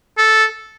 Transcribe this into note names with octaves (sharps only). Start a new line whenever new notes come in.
A4